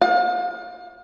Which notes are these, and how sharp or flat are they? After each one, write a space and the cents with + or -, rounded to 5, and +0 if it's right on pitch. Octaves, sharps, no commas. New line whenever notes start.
F5 +40